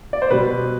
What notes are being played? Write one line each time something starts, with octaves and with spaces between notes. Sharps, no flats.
D5
C5
B2 G3 B4